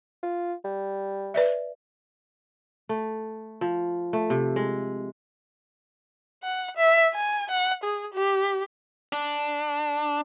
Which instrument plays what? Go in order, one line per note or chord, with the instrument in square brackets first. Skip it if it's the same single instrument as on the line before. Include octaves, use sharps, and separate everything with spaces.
[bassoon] F4
G3
[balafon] B4 D5 E5
[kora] A3
F3
A3
C3
G#3
[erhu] F#5
E5
G#5
F#5
G#4
G4
[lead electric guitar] D4